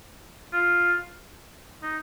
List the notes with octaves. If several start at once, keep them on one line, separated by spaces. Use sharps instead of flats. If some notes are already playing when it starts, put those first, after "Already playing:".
F4
D#4